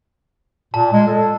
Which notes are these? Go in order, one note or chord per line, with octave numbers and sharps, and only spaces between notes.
A#2 A5
G#3
A4